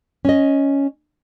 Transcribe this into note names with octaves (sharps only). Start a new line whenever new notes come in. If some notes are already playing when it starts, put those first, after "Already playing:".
C#4 D#5